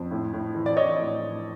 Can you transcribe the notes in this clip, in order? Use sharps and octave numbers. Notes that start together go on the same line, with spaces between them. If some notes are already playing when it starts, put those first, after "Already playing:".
Already playing: F2
A2
A2
E3
D5
E3 C#5 D#5
A2
A2